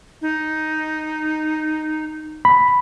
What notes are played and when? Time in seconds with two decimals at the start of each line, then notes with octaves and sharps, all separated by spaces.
0.22 D#4
2.45 B5